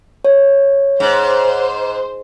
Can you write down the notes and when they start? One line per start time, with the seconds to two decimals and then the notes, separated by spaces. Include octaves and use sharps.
0.25 C#5
1.00 G#2 C5